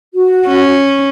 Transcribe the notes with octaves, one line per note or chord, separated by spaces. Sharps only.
F#4
C#4